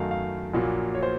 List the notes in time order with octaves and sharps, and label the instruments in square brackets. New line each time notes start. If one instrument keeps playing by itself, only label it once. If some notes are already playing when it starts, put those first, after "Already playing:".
Already playing: [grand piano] F#2 D#3 F#3 A3 F5
F5
A#1 A#2 F#3 A#3
C#5
C5